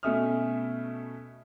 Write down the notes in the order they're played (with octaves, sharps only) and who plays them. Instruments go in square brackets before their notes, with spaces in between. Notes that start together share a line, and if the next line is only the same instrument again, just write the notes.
[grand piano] B2 A3 C#4 E5 D#6 F6